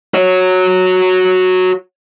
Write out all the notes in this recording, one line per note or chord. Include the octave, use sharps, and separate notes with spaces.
F#4 C#5